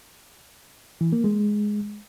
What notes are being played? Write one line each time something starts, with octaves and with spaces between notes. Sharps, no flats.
E3
A#3
G#3